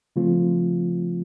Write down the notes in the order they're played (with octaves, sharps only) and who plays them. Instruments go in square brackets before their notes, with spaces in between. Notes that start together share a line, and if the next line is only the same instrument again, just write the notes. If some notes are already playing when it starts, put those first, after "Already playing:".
[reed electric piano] C#3 F3 A3 C4 F4